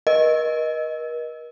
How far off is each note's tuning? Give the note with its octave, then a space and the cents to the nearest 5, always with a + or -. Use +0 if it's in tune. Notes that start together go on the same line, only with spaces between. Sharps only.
A#4 +45 D#5 +0